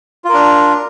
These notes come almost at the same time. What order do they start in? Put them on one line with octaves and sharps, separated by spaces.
F4 A#4 D4